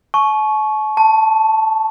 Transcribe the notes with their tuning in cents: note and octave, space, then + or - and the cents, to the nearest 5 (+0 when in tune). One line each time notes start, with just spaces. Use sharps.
A5 -45 C#6 +0
A5 +0 C6 +0